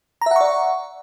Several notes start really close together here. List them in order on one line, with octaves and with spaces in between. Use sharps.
A#5 E5 F#5 C#6 D5